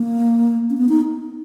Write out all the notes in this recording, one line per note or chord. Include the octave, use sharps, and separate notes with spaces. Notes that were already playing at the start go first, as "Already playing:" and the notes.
Already playing: A#3
C#4
B3
D#4